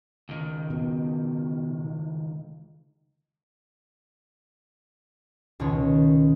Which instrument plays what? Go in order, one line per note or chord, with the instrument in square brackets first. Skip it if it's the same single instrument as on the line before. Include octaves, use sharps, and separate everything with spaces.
[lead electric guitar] C#2 D#3
[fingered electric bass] B2
[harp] C#2 B2 D#3 C#5